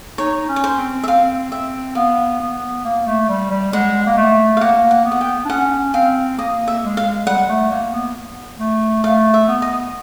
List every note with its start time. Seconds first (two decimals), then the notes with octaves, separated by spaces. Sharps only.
0.18 D#4 C#5
0.49 C#4
0.56 C#5
0.64 C5
0.78 C4
1.03 E5
1.08 C4 F5
1.51 C4 E5
1.95 B3 F5
2.40 B3
2.84 A#3
3.06 A3
3.29 G3
3.51 G3
3.73 G#3 F#5
4.07 A#3
4.17 A3
4.57 F5
4.61 A#3 F#5
4.91 F#5
5.05 B3
5.12 F#5
5.21 G5
5.45 D4
5.50 C#4 F#5
5.94 C4 F5
6.38 A#3 D#5
6.68 E5
6.82 G#3
6.97 F5
7.27 G3 F#5
7.49 A3
7.71 A#3
7.93 B3
8.59 A3
9.04 A3 F5
9.34 E5
9.48 B3
9.62 D#5